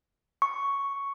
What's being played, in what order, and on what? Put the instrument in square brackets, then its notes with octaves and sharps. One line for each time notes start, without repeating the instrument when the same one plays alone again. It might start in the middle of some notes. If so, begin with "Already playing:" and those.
[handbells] C#6